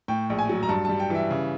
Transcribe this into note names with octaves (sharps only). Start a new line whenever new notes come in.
A2 G5
A#1
G#5
F#3
A#5
G2 A5
G3 A5
G5
E3 E5
C#3